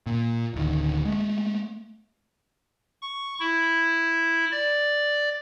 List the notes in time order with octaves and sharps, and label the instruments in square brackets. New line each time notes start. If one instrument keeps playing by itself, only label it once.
[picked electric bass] A#2
D1 D2 D#3
G#3 A3
[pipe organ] C#6
E4
D5